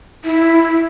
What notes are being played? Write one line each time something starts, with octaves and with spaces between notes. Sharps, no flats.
E4